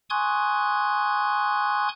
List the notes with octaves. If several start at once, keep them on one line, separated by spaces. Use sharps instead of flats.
G#5 C6 C#6 D#6 F#6 G#6